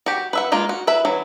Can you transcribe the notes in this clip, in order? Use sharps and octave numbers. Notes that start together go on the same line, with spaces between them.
F#4 G4
B4 E5 F#5
G#3 A#3 F4
F#4
E4 B4 E5
E3 F#3